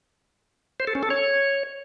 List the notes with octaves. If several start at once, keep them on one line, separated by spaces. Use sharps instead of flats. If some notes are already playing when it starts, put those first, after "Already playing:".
C5
A4
C#4
A4
C#5